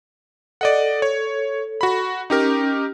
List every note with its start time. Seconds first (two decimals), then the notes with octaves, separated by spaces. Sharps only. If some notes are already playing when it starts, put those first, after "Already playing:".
0.61 A4 D5 D#5 F#5
1.02 C#5
1.81 F#4 B5
2.30 C#4 D#4 G4 A#4